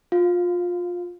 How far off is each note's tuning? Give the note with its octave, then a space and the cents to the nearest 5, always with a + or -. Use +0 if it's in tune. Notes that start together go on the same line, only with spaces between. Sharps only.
F4 +20 F5 +0